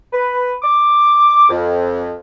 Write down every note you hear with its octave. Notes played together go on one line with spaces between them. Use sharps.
B4
D6
F2